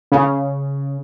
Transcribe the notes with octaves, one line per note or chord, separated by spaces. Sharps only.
C#3